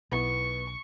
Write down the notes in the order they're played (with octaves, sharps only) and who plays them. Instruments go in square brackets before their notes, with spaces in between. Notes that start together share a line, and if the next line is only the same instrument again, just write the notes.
[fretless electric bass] B1 [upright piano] B3 E4 [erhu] C#6